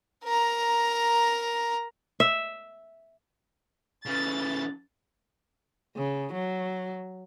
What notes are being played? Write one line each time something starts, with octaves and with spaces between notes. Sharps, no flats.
A#4 A#5
E5
C#3 E3 A6
C#3
F#3